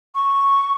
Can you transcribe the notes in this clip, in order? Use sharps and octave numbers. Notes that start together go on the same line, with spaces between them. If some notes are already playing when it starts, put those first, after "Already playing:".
C#6